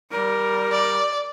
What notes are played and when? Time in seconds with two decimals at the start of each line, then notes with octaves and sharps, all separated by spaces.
0.10 G3 A#4
0.72 D5